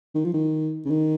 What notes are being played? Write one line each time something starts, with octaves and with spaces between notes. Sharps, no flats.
D#3
F3
D#3
C#3
D#3